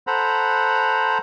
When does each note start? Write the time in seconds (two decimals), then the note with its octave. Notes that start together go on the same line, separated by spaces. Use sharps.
0.07 A4 C5 F#5 A#5 B5